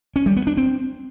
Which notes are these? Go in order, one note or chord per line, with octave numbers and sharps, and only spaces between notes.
C#4
G3
B3
D4
C4